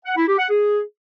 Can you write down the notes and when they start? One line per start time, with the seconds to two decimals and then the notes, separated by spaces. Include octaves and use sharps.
0.05 F#5
0.16 E4
0.27 G4
0.38 F#5
0.49 G#4